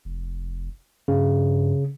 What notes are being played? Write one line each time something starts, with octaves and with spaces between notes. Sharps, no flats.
F1
G2 C#3